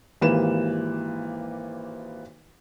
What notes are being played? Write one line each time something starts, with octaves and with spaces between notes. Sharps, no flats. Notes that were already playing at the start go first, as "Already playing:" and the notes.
G#1 E3 A#3 G4 B4 E7